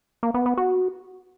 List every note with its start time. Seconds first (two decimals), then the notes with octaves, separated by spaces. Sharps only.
0.23 A#3
0.34 B3
0.46 B3
0.57 F#4